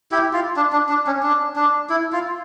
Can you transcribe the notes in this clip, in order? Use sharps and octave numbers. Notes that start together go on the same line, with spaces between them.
E4 G4
F4
D4
D4
D4
C#4
D4
D4
E4
F4